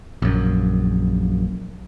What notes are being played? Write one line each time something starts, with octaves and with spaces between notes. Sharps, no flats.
A#1 F#2